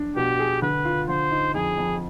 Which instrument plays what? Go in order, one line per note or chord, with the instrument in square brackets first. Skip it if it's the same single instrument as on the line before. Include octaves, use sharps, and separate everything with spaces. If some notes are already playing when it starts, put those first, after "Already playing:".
Already playing: [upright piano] D4
[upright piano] B2 [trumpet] G4
[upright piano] G#4
[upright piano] D3 [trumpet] B4
[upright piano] F4
[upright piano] D3 [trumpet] C5
[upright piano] D#4
[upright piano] F2 [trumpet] G#4
[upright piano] F2